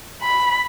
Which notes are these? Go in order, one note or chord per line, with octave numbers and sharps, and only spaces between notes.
B5